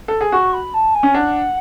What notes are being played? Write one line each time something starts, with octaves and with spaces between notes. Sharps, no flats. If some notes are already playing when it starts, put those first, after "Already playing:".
A4
G#4
F#4 C#6
B5
A5
G#5
C#4
D4 F#5